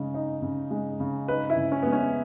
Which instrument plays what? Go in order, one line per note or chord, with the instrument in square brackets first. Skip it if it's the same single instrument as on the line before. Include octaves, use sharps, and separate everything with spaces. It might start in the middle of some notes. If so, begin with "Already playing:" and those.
Already playing: [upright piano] C#3 G#3
D#4
C#3
G#3
C#3
[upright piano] D#4 [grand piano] B4
[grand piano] E4
[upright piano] C#3
[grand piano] C#4
[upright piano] G#3 [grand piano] B3
[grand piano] C#4